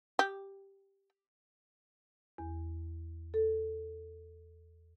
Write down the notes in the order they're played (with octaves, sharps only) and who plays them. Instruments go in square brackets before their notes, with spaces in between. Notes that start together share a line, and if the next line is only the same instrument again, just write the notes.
[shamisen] G4
[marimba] E2
A4